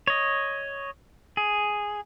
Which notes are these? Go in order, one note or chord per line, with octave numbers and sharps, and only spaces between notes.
C#5 D#5
G#4